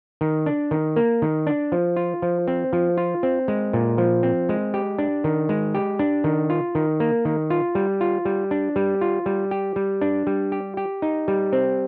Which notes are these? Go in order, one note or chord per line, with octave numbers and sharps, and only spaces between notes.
D#3
D4
D#3
A#3
D#3
D4
F3
F4
F3
C4
F3
F4
C4
G#3
A#2
F3
C4
G#3
G4
D4
D#3
G#3
G4
D4
D#3
F4
D#3
A#3
D#3
F4
G3
F4
G3
D4
G3
F4
G3
G4
G3
D4
G3
G4
G4
D#4
G3
C4